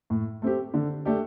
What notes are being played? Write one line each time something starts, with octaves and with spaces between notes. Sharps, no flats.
A2
A3 C4 G4
D3
A3 D4 G4